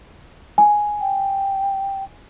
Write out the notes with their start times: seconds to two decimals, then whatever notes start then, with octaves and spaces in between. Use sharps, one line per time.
0.58 G#5
1.01 G5